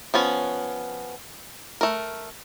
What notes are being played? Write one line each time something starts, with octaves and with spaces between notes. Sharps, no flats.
F3 B3 C#4
A3 A#4